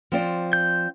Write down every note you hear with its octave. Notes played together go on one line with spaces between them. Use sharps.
F3 C4 D5
G6